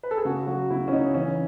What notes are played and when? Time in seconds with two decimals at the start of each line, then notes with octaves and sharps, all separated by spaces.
0.03 B4
0.11 A4
0.17 G#4
0.25 C#3 F#4
0.47 F#3 F#4
0.70 C#3 E4
0.88 C#4
0.92 C#3 D#4
1.14 E3 C#4